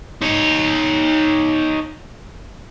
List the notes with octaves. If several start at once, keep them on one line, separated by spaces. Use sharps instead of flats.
D#4 C#5